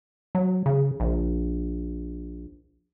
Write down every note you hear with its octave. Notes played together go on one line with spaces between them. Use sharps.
F#3
C#3
A#1